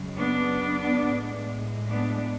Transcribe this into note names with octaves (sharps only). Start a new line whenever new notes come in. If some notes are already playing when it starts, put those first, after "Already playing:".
Already playing: F#2 C#3 G#3
B3 D4
A2 G#3
B3 D4